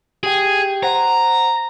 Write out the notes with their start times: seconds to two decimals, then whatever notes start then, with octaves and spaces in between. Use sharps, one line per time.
0.23 G4 G#4 G5
0.83 C5 F#5 A#5